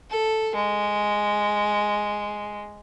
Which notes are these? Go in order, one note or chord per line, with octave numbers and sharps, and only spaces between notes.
A4
G#3